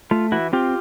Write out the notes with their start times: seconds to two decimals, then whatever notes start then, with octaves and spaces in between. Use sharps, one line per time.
0.11 A3 F4
0.32 E3 E4 F#4
0.53 C4 F4 G4